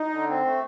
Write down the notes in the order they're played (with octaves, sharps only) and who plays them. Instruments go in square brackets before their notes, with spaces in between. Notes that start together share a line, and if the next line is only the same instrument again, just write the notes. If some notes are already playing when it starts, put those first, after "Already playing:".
Already playing: [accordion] D#4
D3
C4
A3